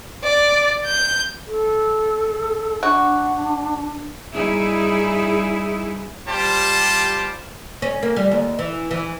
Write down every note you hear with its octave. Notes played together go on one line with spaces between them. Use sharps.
D5
G6
A4
D4 F#4
G2 D#4 E4 G#4 E5
G3 F4 G4 C5 A5
C#4
A#3
G3
D#2
E3
E3